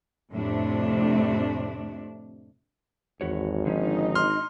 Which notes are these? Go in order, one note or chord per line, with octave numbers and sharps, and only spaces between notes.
F2 A2 C3 A3 D4
G#1 E2 F#4 C#5
D3 F3 C#4 D#4
C6 F6